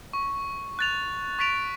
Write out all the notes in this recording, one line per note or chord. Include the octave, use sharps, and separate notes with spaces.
C#6
F#6 A6 F7
C#6 A6 B6 D7 F7